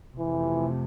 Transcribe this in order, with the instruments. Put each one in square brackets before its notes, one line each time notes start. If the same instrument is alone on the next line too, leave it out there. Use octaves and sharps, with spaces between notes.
[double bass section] F2 C3 F3 A3 [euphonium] E3